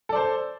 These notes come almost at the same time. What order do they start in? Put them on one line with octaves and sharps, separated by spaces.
A4 D5 C5